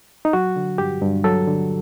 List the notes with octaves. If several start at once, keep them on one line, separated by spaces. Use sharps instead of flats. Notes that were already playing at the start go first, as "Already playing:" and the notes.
D#4
F#3 F#4
D3
G2 G4
G2
F#3 A4
D3